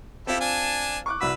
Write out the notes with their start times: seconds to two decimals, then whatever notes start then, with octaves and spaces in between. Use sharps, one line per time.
0.27 C4 E4 F4 G4 A4
0.41 D4 G#5 A5
1.06 C#6 D6 F#6
1.21 C2 F#4 B4 E6 B6